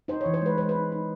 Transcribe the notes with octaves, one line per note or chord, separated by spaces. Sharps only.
D#4 C5
C#5
E3
C5
G#3 B4
G#3 C5
B4
D#4
D#4